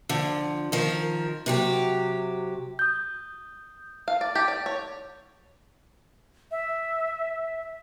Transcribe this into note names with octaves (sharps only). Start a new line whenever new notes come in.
D3 F3
D#3 F3 A#4
C3 F#3 G4
D#6 G6
F5
D5
G4
D5
C#5
E5